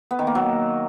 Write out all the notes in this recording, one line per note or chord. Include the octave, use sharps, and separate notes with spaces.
B3
D#3
A#3
F#3